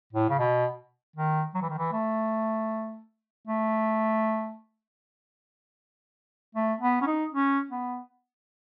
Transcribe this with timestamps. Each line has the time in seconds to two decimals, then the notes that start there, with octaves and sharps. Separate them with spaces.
0.12 A2
0.29 C#3
0.39 B2
1.16 D#3
1.54 F#3
1.62 E3
1.70 D#3
1.78 E3
1.92 A3
3.47 A3
6.55 A3
6.80 B3
7.02 C#4
7.07 D#4
7.32 C#4
7.71 B3